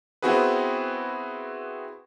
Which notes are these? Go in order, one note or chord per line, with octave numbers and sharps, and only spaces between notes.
B3 C4 E4 F#4 G#4 B4